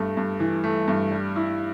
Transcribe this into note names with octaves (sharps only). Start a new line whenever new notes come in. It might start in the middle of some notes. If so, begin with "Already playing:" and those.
Already playing: G2 A3
G2
E3
A3
G2
G3
E4